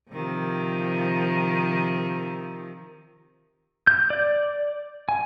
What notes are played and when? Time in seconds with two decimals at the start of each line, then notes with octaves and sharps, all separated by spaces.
0.10 C3 D#3 F3
3.87 G6
4.10 D5
5.09 G#5